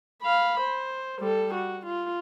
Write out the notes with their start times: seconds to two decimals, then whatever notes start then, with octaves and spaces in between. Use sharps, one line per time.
0.22 F5 B5
0.60 C5
1.20 G3 A4
1.54 F#4
1.86 F4